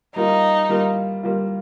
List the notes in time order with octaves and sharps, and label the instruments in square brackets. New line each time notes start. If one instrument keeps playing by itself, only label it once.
[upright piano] G3 A#3 F4 [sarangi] D#4
[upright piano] G3 A#3 F4
G3 A#3 F4